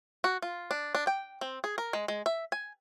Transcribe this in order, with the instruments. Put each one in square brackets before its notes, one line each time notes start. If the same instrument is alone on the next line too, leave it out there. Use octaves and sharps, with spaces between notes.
[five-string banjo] F#4
F4
D4
D4
G5
C4
G#4
A#4
G#3
G#3
E5
G#5